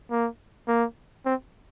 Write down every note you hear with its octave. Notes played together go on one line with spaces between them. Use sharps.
A#3
A#3
C4